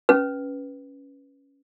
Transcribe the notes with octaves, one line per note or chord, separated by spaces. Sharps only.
C#4 B4